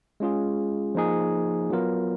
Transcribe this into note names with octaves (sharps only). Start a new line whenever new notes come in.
G#3 C#4 F4 G#4
F3 A#3 D#4 G#4
F#3 B3 F4 A#4